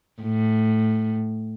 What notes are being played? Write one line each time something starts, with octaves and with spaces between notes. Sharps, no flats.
A2